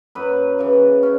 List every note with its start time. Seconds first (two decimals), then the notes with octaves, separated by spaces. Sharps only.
0.15 F#2 B4
0.59 C#3 E3
1.03 C#4